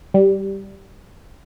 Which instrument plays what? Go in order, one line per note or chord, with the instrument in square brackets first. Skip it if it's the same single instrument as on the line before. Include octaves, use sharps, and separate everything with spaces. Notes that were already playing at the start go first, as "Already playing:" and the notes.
[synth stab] G3